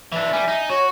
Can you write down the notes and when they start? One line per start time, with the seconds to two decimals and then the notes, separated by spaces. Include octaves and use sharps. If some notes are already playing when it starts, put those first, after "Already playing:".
0.12 E3 D4 E5
0.33 G3 G#5
0.48 D#4
0.70 F#4 C#5